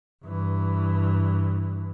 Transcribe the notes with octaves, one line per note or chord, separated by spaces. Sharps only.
G2 E3